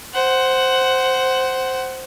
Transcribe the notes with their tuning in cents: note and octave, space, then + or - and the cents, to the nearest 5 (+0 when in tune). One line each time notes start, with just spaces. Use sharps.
C5 +0 F#5 +15